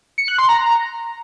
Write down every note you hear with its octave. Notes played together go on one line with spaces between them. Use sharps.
C#7
F#6
C6
A#5